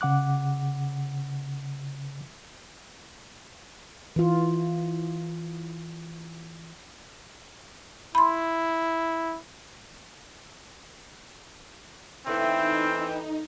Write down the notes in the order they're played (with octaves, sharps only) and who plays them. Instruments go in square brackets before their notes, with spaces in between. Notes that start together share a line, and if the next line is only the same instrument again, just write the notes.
[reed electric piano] C#3 F#5 D6 F#6
[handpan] E3 F4
[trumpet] E4 [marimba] B5 C6
[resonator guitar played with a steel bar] E2 A3 [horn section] E3 G5 [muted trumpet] C4 [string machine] D#4